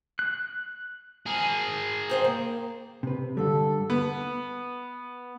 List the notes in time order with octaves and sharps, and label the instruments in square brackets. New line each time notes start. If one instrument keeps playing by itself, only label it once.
[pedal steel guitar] F#6
[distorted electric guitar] G#4 A#4
[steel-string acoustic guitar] G2 C5 G5
A#3
[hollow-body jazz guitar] C3 B4
[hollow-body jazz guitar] G2 D3 G3 [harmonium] A4
[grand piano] B3